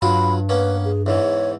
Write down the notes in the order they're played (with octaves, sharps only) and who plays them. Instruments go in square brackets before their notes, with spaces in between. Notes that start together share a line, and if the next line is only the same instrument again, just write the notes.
[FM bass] G2 [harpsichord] F#3 F4 F#4 [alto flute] B5
[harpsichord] A#3 B3 C#4 [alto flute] B4
[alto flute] G#4
[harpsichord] E2 G#2 E3 [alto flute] C#5